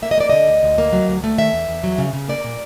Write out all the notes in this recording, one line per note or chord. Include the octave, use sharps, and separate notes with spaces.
A#3 E5
D#5
A#3 D5
D3 D#5
D2
D2
A#3
F#3
D2
A3
D#3 E5
E2
E2
F#3
C#3
C#3
A#3 D5
A#2